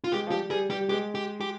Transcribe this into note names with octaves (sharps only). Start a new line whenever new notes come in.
F4
G#3 G4
F3
G3 G4
G3 G#4
G3 G4
G#3 G4
G4
G4